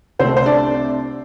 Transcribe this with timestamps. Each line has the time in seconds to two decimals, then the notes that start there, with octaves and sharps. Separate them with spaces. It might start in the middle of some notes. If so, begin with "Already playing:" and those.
0.19 C2 C3 A3 C4 C5
0.37 C5
0.46 D4 D5